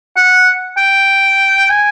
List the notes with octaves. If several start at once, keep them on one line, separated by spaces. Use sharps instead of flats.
F#5
G5
G#5